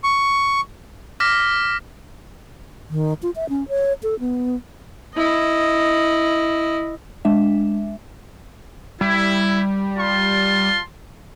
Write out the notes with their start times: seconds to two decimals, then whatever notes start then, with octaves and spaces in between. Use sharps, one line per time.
0.04 C#6
1.20 D6 F6 A#6 B6
2.90 D#3
3.23 F4
3.36 E5
3.49 C#4
3.69 C#5
4.03 A4
4.20 B3
5.15 E4 D#5
7.25 G#3 D4 E5
9.01 G3 E4
9.98 F4 A5 C6